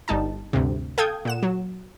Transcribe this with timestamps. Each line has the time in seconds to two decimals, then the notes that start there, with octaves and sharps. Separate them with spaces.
0.08 G1 G3 D#4 A5
0.53 D2 G2 C3
0.98 A4 F5 G5 D#6 G6 G#6
1.25 A#2 F#5 E7
1.43 F#3